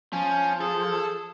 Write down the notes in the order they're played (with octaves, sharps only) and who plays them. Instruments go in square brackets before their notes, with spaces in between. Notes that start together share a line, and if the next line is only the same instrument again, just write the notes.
[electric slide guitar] F3 [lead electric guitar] C#4
[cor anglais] G#4 [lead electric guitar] A4